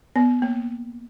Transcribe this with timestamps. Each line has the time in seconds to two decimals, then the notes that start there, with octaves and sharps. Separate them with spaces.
0.16 B3
0.42 A#3